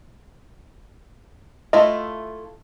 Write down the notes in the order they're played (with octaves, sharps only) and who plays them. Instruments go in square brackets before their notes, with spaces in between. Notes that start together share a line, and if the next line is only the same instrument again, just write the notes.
[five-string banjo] A3 E4 F4 [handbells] D#5